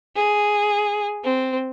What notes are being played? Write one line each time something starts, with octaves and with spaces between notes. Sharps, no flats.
G#4
C4